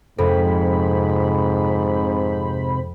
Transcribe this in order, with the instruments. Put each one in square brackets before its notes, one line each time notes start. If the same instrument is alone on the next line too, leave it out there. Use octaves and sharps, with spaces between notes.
[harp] F2 [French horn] G#2 [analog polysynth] C3 C5 B5 [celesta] A4